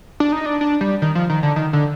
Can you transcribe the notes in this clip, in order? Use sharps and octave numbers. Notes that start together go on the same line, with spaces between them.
D4
D#4
D4
D4
G3
D#3
F3
D#3
D3
D#3
D3